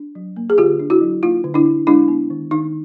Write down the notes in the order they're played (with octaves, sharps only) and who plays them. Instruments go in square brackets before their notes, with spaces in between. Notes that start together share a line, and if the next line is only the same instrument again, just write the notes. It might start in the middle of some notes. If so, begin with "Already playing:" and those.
Already playing: [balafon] D4
F#3
A#3
G#4
D3 F4 G4
D4
E4 F#4
F#3
A#3 D#4 F4
D3
D4 E4
D4
G#3 D4 E4
B3
D#3
D#3 D#4